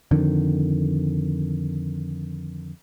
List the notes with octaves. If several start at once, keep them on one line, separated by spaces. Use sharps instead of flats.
F2 D3 D#3